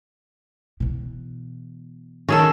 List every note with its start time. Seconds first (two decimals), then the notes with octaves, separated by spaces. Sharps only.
0.80 B2 E3
2.29 D#3 C#4 G#4 A4